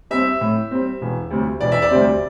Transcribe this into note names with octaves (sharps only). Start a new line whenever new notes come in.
G3 C4 E5
A2
G3 C4
E1
D2 C3 G3 C4
E1 D5
E5
D5
D2 C3 G3 C4